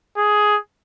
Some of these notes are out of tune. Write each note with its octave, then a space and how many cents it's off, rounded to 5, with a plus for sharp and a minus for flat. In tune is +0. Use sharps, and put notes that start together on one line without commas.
G#4 +10